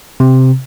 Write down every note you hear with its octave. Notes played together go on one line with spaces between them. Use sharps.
C3